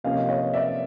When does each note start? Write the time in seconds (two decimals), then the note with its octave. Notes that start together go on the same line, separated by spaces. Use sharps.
0.04 C3 F3 A#3 C#4 D#5 F5
0.29 C#5 D#5
0.54 D5 E5